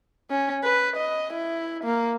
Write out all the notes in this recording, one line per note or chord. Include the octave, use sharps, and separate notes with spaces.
C#4
B4
D#5
E4
A#3